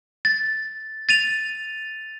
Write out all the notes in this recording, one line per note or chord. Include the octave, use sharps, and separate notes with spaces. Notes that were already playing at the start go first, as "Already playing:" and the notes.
A6
A6 D#7 F7